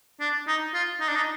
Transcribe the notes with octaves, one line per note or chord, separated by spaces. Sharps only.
D4
D#4
F4
D#4
D4
D#4